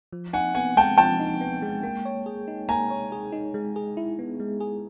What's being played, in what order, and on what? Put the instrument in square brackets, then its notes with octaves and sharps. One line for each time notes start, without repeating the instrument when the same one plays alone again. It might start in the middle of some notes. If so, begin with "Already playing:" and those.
[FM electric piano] F3
[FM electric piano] D#4 [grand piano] F#5 G#5
[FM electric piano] B3 [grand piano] F#5 G#5
[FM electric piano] G#3 [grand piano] G5 A5
[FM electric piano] F3 [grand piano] G5 A5
[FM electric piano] D#4
B3
G#3
A#3
C#5
G#4
D#4
[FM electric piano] A#3 [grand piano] G#5 A#5
[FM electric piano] C#5
G#4
D#4
G#3
G#4
E4
B3
G#3
G#4